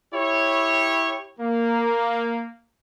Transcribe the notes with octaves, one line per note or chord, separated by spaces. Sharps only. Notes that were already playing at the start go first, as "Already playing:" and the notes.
E4 G4 C#5
A#3